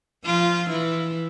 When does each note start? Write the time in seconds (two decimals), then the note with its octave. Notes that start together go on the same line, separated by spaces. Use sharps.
0.25 F3 F4
0.70 E3 E4